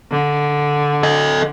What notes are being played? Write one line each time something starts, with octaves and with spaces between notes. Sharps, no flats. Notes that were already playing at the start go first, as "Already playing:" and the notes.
D3
A4 D#5